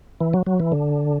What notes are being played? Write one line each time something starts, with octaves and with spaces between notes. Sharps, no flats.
E3
F#3
F#3
E3
D3